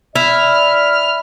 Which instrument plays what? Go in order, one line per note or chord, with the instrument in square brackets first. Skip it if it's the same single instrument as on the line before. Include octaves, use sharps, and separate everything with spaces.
[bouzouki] E4 [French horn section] D5 [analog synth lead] F6